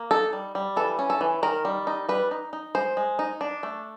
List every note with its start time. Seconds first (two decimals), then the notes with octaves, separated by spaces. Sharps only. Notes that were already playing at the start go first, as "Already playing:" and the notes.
Already playing: A#3
0.11 D#4 A4
0.33 G3
0.55 G3
0.76 E3 A4
0.99 C#4
1.10 A4
1.21 E3
1.43 D#3 A#4
1.65 G3
1.87 D#4
2.09 G3 B4
2.31 D#4
2.53 D#4
2.75 G#3 C5
2.97 G#3
3.19 D#4
3.41 D4
3.63 A3